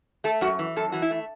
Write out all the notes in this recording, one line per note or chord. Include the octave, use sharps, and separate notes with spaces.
A3 A4
F#2 F#4
E3
F#2 A4
E3 F#4
E4
A3